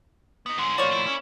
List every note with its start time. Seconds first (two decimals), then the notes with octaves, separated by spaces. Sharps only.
0.46 B3 D#4
0.59 G#2 D3 G#3
0.78 A2 F3 A#3 F#4 C#5 D5
0.93 E4
1.07 C#4